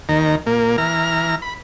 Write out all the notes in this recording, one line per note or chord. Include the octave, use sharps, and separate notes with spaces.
D#2 D#3 A#5
A#2 A#3
E3 A#5 F6
B5